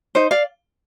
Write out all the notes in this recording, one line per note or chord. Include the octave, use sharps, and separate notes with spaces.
D#4 C5
D5 F5